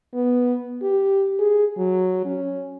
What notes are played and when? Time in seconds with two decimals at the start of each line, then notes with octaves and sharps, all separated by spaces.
0.14 B3
0.82 G4
1.39 G#4
1.77 F#3
2.25 C#4